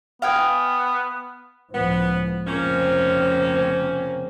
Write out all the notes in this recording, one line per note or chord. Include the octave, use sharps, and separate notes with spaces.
B3 F5 G5 G#5
C#2 A2 F3 B3
F1 C#3 F3 A#3 C4 C#4